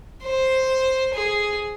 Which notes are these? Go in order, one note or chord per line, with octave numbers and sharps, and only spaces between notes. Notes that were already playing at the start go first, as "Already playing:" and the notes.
C5
G#4